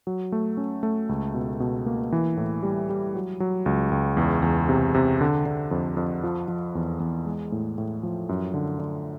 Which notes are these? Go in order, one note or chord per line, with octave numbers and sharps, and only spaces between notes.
F#3
A3
C#4
A3
C#2
B2
B2
A#3
E3
A2
G3
G3
F#3
F#3
C#2
C#2
E2
E2
C3
C3
D3
D3
F2
F2
F3
F3
E2
E2
G#3
A2
A2
F3
F#2
D3
D3